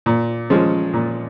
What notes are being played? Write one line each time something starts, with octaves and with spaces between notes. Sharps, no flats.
A#2
F3 G#3 C#4
A#2